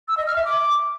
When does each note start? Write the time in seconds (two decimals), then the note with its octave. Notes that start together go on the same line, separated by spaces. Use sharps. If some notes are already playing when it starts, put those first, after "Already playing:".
0.08 E6
0.17 D#5
0.26 F6
0.36 E5
0.45 D6